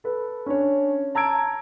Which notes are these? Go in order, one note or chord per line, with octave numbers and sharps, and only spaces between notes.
A4 B4
C#4 D4 C#5
A5 A#5 E6 G#6 D7